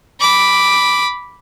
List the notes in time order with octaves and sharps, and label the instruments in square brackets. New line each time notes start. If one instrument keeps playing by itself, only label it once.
[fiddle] B5 D6